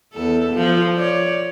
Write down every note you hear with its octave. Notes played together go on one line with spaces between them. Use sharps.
E2 A4
F3
C#5 D5